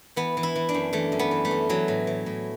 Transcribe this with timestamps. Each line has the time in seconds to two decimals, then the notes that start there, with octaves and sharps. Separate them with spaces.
0.16 E3 B3
0.37 E3
0.43 E4
0.56 E3
0.69 D4
0.74 F#2
0.93 E3 A3
1.12 F#2
1.19 B3
1.31 E3
1.45 A3
1.51 E3
1.69 E3 F#3
1.88 A2
2.07 E3
2.26 A2